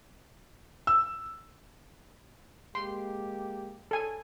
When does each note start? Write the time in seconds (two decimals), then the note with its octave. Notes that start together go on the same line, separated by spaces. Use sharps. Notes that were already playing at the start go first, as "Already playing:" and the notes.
0.87 E6
2.75 G#3 A#3 G4 C6
3.91 A4 G#5